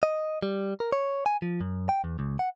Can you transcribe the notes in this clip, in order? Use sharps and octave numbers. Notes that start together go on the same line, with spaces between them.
D#5
G3
A#4
C#5
G#5
F3
F#2
G5
E2
C#2
F#5